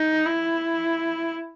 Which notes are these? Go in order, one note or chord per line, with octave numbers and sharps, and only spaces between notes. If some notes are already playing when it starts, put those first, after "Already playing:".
Already playing: D#4
E4